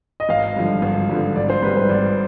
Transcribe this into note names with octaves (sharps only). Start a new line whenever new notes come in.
D#5
G#1 F5
G2 D3 F3
G#1
G2 D3 F3
G#1 D5
C5
G#2 G3 B4
C5
G#1 D5